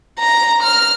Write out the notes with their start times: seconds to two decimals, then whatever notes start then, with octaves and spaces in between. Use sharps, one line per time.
0.19 A#5
0.63 F6